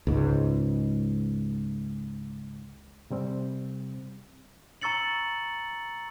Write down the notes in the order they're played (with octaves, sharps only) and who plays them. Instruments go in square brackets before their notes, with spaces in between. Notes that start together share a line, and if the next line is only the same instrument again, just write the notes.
[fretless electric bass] C#2 G#2
[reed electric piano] C3 G3 C4
[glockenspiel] A#5 C#6 E6 A6 C#7 F#7